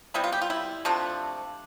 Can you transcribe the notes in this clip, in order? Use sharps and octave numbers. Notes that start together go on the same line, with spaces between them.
C3 G3 B3 E4
F4
G4
F4
E4
C3 F3 A3 D4